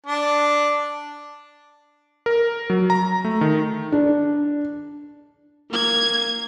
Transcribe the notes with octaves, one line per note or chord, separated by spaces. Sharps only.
D4
A#4
F#3
A#5
A3
D#3
D4
A#3 G#6